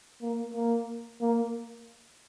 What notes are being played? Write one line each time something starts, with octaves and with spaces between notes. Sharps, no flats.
A#3
A#3
A#3